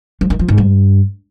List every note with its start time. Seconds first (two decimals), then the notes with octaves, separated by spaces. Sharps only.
0.21 F3
0.30 D#3
0.39 F3
0.48 G#2
0.58 G2